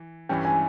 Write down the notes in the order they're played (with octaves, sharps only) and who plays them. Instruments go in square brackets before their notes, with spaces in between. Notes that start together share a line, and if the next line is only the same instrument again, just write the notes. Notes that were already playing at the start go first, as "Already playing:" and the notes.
Already playing: [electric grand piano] E3
[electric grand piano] G2 E3 G3 C#4 [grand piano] G5
[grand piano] G#5